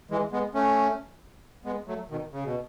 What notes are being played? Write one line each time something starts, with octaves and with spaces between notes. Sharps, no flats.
E3 G#3
G#3 B3
A3 C#4
G#3 B3
F#3 A3
B2 D#3
C#3
B2